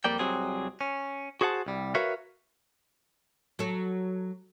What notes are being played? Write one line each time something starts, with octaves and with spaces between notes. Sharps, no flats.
F2 G3 A#3 D5 G5
C2 C3 F#3 C4 G#4
C#4
F#4 G#4 C5 F#5 A5
C2 G3
F#4 A#4 B4 C#5 E5 F5
F#3 A4